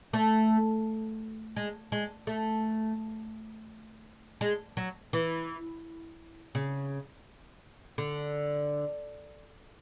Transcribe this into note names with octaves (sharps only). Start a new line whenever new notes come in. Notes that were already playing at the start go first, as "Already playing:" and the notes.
A3
G#3
G#3
A3
G#3
F#3
E3
C#3
D3